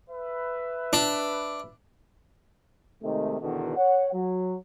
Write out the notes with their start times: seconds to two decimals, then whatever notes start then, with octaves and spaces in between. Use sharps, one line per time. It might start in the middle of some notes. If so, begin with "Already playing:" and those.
0.10 B4 E5
0.93 D4
3.03 C3 D#3 G#3 A3
3.41 E2 B2 D3 D#3
3.77 C#5 F#5
4.13 F#3